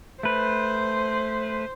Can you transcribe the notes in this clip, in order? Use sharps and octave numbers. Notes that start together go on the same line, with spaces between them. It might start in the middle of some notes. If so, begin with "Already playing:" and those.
A3 B4 C5